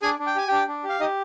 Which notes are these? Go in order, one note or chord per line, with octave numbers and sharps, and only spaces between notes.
D4 G#4 G#5
D4
G5
G4 G#5
D4 G4 G5
D4
G4
F5
D#4 G4 D#5